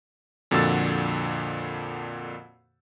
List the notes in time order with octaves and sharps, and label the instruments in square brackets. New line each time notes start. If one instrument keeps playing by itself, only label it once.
[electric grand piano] F2 A#2 D3 F#4 E6 A6